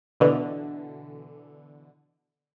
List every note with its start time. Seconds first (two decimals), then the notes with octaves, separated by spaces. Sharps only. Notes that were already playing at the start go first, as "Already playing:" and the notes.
0.20 B2 D3 E3